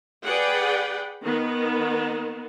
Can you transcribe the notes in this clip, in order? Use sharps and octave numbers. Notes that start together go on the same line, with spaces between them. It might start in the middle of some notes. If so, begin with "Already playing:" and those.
G#4 B4 D5 F#5 G5
D#3 B3